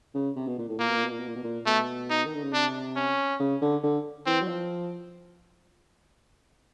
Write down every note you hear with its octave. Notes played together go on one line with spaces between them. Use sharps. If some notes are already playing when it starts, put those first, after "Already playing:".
C#3
C3
B2
A#2
A2
A#2 A#3
B2
A#2
B2
A#2
B2
A#2
B2
A#2
B2 A3
D#4
D#3
D3
C#3
C3 D4
C#4
C#3
D3
D3
E3 C4
F#3
F3